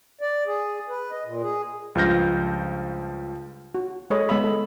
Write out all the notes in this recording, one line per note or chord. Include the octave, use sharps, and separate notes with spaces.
D5
G#4
B4
D#5
A#2
G#4
C#2 G2 F3 F6 G6 A#6
F#4
G#3 G#4 A4 C#5 D#5 B5
G#3 B3 E5 B5
A4